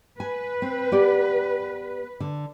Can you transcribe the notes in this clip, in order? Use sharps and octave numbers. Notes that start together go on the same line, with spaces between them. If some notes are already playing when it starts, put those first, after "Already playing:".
B4 G#5
C4
B3 G4 D5
D3